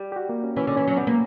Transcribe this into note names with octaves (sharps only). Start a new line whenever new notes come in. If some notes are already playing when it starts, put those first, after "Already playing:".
Already playing: G3
G4
F#4
A#3
C#4
E3 C#4
D3
E3 C#4
F#3
G3 B3
A#3